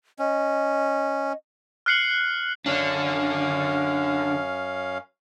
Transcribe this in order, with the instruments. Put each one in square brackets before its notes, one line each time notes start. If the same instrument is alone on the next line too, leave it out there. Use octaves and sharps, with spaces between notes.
[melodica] C#4 [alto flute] D#5
[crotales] F6 F#6 C7 C#7 F#7
[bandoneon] F#2 C#4 F5 [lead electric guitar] D3 D4